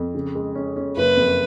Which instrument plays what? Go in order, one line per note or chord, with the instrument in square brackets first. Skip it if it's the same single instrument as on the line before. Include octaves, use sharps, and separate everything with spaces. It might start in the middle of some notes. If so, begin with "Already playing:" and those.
Already playing: [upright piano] F2
C#3
G#3
C#4
C#4
[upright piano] F#1 [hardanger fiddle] B4
[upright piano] F2